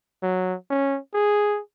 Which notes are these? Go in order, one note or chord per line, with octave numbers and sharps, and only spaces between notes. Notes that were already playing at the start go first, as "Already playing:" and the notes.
F#3
C#4
G#4